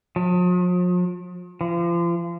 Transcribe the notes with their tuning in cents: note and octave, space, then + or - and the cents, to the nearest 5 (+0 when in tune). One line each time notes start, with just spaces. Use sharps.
F3 +45
F3 -35